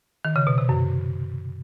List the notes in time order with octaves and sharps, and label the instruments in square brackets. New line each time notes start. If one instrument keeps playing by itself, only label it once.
[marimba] D#3
C#3
B2
C3
F#2